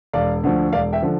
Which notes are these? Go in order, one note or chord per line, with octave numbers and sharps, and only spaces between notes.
E1 D5 F5
D2 D3 F3
E1 D5 F5
E5 G5
D3 F3